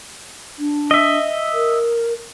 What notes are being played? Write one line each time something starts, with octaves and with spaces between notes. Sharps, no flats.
D4
D#5 E5
A#4